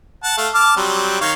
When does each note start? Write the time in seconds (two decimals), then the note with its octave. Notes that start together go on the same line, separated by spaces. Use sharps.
0.24 F#5 A5
0.38 A3 F5
0.54 A5 D6 F6
0.77 F#3 G3 C4
1.21 D#3 C#5 F5